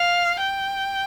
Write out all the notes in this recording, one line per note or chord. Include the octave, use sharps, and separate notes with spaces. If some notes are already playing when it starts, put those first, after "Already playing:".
Already playing: F5
G5